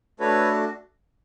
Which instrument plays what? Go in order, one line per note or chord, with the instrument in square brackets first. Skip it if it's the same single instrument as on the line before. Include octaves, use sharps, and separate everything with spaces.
[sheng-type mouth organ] A3 D4 F#4 A4 B4 C#5